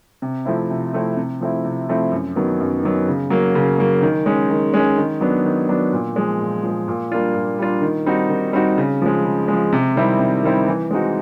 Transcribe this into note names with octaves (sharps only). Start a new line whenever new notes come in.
C3
F3 A3 C4 E4
C3
F3 A3 C4 E4
C3
F3 A3 C4 E4
C3
F3 A3 C4 E4
F#2
D#3 F#3 B3
F#2
D#3 F#3 B3
C#3
F#3 A#3
C#3
F#3 A#3
D#3
G#3 C#4
D#3
G#3 C#4
D#3
F#3 B3 D4
D#3
F#3 B3 D4
A#2
F3 G#3
A#2
F3 G#3
A#2
G3 A#3 D4 F4
A#2
G3 A#3 D4 F4
D#3
G3 C4 D#4 F#4
D#3
G3 C4 D#4 F#4
C#3
F3 G#3
C#3
G#3
F3
C3
D#3 G3 C4 E4
C3
D#3 G3 C4 E4
E3
G#3 C4 D#4 F#4